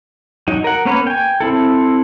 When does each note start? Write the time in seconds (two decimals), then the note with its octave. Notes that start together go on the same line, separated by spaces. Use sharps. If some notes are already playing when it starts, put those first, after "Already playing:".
0.48 F#3 D#4
0.64 A#4 F#5
0.85 A#3 B3 C#4 B4 C#5
1.07 G5 G#5
1.40 C4 E4 A4